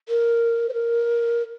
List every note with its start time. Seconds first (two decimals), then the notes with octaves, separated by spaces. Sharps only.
0.09 A#4
0.69 C5
0.73 A#4